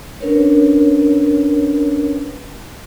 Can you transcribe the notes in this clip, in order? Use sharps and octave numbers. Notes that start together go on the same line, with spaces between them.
C#4 D4 A#4 B4 C#5